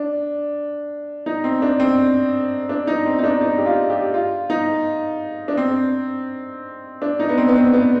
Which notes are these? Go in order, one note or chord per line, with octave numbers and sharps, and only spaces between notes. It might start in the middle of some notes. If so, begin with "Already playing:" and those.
Already playing: D4
D#4
C4
D4
C4
D4
D#4
C4
D#4
D4
D#4
G4
F4
G4
F4
D#4
D4
C4
D4
D#4
B3
C4
B3
C4
B3